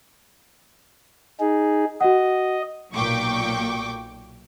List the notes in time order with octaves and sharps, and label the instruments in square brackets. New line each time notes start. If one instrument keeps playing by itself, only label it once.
[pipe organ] D#4 G#4
[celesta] F#4 F#5 [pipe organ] D#5
[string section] B1 A#2 G5 C#6 D6